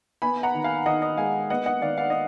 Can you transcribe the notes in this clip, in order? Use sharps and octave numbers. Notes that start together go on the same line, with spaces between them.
B3 G#5 B5
F#5 A#5
D#3
F5 G#5
D#3 D#5 F#5
D#5
G#3 F5 G#5
B3 D#5 F#5
D#5 F#5
D#3 D5 F5
D5 F5
D#5